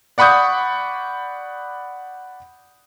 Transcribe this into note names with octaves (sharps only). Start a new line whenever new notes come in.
D5 F#5 B5 C#6 D#6 G6